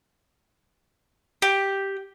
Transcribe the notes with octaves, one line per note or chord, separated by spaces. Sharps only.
G4